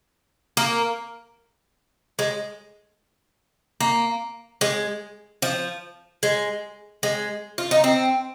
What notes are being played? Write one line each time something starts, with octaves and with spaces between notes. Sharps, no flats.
A#3
G#3
A#3
G#3
F3
G#3
G#3
F4
D#4
C4